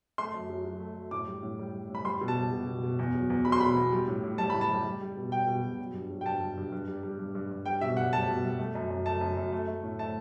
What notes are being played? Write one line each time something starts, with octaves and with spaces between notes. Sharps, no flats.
A3 C6
F#2
F#3
F#3
A3
A3
A2 D6
G3
A2
G3
G3
A2
B5
G3 C6
B2
A5
G3
B2
B2
B2
E2
F#3
E2
F#3 B5
C6
B2 B5
E2
G3
A2
A2
G3 A5
A2 B5
A5
G3
G3
G3
B2
G3 G5
B2
B2
F#3
G2
F#3
G5
G2 A5
G2
G2
G2
G3
G3
G2
G2
G2
G3 G5
B2 E5
G3 F#5
G3 A5
B2
G3
A3
F#2
F#2
A3 A5
F#2
F#2
A3
A3
A2
A3 A5